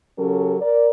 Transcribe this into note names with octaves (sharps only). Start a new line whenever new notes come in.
C#3 F#3 C#4 G4 A4 A#4
A#4 D5